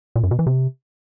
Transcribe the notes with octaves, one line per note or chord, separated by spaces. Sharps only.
A#2
F#2
B2
E3
C3